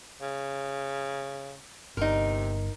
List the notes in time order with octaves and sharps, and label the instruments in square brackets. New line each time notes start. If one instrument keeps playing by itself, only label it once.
[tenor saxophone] C#3
[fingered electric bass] G1 [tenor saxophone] C3 [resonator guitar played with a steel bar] D#4 A#4